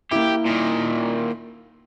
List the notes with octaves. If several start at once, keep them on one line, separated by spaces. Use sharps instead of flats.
A#3 E4 G4
A#2 D#3